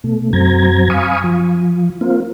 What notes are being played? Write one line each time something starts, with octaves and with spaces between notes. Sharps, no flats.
B2 A3
F#2 F#3 C4 A#5 G#6
F5 G#5 B5 C#6 D#6
F3
A#3 C4 F4